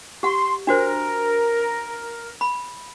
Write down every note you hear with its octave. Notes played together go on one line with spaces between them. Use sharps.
G4 F#5 C6
D4 F#4 A#4 C5
B5